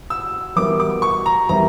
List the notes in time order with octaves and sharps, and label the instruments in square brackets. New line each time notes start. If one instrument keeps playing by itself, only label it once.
[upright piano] E6
[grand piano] E3 G3 B3 E4 A#4 [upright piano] D6
[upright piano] D6
C#6
A#5
[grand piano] E3 G3 B3 E4 A#4 [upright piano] A#5